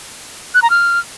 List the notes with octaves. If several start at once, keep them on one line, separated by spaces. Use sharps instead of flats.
F#6
A#5
F6